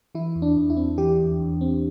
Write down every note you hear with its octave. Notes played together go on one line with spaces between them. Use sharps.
E3 E4
E2
D4
E2
E4
C4
E3 G4
E2
E2
C4